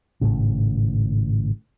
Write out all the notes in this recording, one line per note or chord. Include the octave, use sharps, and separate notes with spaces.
G#1 A2 C#3